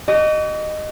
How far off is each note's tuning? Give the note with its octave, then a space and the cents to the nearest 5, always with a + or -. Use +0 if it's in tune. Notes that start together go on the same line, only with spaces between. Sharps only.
F#4 +45 D#5 -15